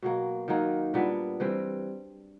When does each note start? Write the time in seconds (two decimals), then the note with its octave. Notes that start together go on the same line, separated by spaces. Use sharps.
0.02 B2 F#3 A#3
0.48 D#3 F#3 A#3 D#4
0.94 A#2 G3 B3 D4
1.40 E3 G3 C4